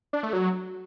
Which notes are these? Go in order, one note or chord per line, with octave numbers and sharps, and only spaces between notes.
D4
A3
F#3